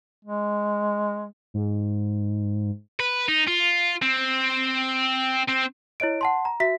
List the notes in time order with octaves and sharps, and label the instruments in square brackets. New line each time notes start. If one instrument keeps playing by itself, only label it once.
[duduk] G#3
[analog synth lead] G#2
[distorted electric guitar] B4
D#4
F4
C4
C4
[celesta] E4 C#5 D#5 D7
F#5 A5 C6
A#5
F#4 E5 B6